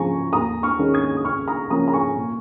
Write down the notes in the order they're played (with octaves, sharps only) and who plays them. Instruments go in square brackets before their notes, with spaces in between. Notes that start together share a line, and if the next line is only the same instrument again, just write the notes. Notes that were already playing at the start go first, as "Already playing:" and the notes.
Already playing: [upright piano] C#3 F3 G#5 A#5 C#6
D#2 A#5 D#6
C#6 F6
D#3 G#3 C#4
D#6 G#6
D#6
C#2 C#6 F6
A#5 D#6
C#3 F3 A#3 C#4 A#5 D#6
A#5
G#5 C#6
A#2